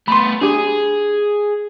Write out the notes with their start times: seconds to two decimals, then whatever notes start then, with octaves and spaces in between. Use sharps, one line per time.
0.08 A3 B3 B5 C6
0.41 D4 G4 G#4